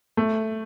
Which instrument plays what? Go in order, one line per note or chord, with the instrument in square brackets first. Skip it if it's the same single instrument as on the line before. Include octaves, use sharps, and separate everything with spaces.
[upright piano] A3